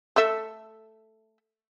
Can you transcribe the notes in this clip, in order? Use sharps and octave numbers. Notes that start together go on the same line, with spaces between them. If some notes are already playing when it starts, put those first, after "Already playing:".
A3 A4 E5